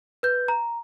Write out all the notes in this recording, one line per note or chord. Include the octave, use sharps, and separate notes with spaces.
B4 G6
A#5